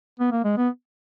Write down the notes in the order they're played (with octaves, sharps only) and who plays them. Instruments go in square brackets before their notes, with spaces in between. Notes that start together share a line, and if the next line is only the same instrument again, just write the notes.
[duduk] B3
A#3
G#3
B3